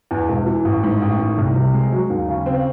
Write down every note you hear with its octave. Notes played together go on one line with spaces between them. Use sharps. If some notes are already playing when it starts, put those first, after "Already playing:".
E2
E1
E3
A1
G#2
A1
D#3
C2
C3
G#3
F#3
D#2
C#3
C4